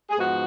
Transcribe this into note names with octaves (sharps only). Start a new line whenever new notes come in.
G#4
G#2 F3 B3 D#4 F#4